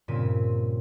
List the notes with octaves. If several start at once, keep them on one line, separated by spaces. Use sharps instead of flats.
G2 A#2 C#3 C4 B6 D#7